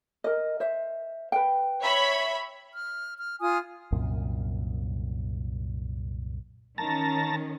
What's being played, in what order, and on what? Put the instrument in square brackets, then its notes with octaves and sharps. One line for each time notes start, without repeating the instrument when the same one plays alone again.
[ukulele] A#4 D#5
C5 E5
B4 G5
[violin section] C#5 E5 B5
[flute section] F6
F6
F4 G#5 D#6 F6
[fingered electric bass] C2 F#2 A#2
[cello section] D#3 C#4 [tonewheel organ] A5 A#5